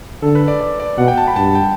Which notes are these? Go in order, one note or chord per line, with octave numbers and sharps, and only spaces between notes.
D3 A4
B4
D5
D5
D5
B2 F#5
G5
A5
B5
G2 A5
G5